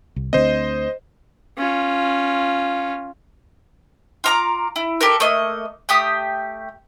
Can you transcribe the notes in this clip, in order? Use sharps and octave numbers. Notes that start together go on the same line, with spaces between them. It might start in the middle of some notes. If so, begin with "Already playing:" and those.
C2
D2 D3 C4 C5 D#5
C#4 F4
F4 A#5 D6
E4
G4 A4 A#4
A3 A#3 D#5
A3 G4 D#6